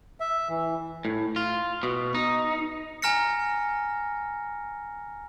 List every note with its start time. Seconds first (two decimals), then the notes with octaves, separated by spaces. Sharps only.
0.20 E5
0.49 E3
1.05 A2
1.36 F4
1.83 B2
2.15 D#4
3.02 G#5 A#5 F6 A#6 C#7